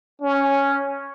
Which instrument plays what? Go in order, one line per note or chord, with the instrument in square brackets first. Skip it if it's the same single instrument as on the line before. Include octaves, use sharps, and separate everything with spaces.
[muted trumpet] C#4